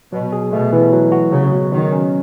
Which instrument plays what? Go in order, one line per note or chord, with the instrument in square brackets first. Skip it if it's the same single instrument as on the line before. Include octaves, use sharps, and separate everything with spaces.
[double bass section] B2 [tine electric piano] F#3
[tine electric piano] G#4
[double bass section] B2 [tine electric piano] A3
[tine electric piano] E3
F#3
F#4
[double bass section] C#3 [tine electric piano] F#3
[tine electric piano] B2
[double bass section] D#3 [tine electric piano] F#3
[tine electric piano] C#4